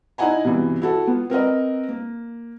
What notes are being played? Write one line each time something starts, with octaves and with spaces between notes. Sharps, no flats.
D#4 E4 D#5 F#5 G#5 A#5
C2 G2 B2 E3
E4 F#4 A4
B3 F4
C4 A#4 B4 D#5
A#3